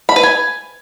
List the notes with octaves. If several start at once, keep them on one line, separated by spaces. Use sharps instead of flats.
B5
B4
G#5